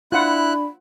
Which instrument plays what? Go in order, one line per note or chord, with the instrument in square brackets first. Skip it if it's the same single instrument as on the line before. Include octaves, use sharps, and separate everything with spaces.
[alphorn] D4 [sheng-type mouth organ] E4 F#6 [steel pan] F4 F#5 [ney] B5